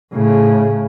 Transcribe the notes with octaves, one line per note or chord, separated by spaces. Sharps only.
A2 C#3